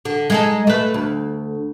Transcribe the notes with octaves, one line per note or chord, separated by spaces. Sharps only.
D3
G#3 D#4 A4
A3 B4
D2